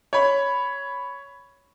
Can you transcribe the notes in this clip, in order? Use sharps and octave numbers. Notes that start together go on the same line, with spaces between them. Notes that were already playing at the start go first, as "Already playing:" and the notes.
C#5 B5